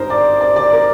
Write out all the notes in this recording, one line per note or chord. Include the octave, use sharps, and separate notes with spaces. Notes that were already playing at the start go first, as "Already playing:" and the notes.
Already playing: G#1 G2 D#4 A#4 C5
D5
D5
D5
A#4